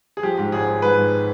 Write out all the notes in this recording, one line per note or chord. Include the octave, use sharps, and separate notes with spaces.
G#4
F3 G4
G#2
G#1 G#4
G#1
G#2 B4
G#2